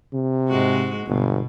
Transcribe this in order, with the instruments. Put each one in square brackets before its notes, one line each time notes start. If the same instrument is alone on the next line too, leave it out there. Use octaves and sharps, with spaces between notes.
[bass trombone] C3
[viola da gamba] G#2 G#3 F#4
[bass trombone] G1 [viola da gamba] B2